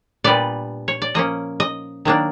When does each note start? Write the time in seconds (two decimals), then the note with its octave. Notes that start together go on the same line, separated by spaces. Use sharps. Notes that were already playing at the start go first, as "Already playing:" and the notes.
0.24 A#2 G3 B3 D4 D5
0.88 C#5
1.02 D5
1.14 F3 A#3 C#4 D#5
1.60 D#5
2.05 D#3 F#3 A#3 D4